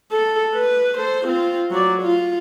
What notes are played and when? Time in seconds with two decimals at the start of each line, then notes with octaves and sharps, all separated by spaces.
0.12 A4
0.55 B4
0.97 A4 C5
1.25 C4 F4
1.71 F#3 D5
2.02 F4